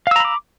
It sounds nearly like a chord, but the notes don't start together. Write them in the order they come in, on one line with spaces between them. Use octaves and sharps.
F5 E6 A#5 B5 D6